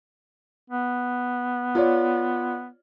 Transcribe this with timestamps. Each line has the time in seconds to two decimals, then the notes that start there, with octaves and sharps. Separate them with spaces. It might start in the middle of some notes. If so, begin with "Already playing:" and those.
0.70 B3
1.75 F4 C#5 D5